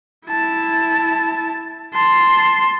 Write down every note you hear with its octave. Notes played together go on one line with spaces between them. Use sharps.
E4 A5
A5 C6